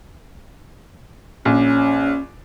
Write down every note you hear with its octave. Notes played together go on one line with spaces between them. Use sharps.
A#1 C#4